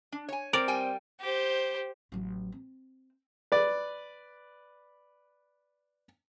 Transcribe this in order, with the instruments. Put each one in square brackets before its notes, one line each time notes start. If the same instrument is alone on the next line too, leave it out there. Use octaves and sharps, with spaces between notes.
[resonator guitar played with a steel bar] D4
C#5 G#5
[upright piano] C4 [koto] A#4 D5
[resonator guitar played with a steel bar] G3 G5 G#5
[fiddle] G4 C5
[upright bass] A1 F#3
C4
[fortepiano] B4 D5